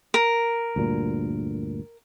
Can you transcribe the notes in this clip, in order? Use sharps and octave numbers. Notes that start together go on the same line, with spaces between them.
A#4
D2 G2 A#2